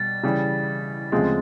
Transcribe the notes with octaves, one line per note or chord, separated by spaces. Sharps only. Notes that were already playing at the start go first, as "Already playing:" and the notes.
Already playing: B2 G3 A6
C#3 E3 G3
D2 C#3 F3 G#3 C4